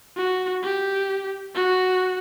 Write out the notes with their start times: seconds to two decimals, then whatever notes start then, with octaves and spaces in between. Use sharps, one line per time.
0.16 F#4
0.63 G4
1.55 F#4